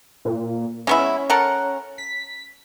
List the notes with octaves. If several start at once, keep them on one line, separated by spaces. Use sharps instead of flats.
A#2
G#3 B3 C#4 E4
A4 A#4 F#5
B6